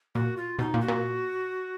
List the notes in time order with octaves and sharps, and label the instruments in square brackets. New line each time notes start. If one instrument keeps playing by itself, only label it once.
[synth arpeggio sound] A#2 [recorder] F#4
[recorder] F4
[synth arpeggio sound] B2 [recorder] D#4
[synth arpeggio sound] A#2
[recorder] F#4
[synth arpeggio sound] A#2